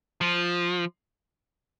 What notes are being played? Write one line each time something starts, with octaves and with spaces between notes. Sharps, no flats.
F3